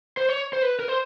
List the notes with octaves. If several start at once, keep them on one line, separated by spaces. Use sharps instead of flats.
C5
C#5
C5
B4
A#4
C5